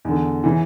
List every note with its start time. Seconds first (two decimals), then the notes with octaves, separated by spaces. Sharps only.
0.05 E2 D3
0.43 C#3 E3